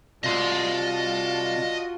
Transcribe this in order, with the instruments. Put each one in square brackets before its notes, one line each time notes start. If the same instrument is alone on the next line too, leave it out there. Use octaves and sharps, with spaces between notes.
[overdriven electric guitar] C2 [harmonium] F4 F#4 [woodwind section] D5 F5 A5 [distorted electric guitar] D#5 C6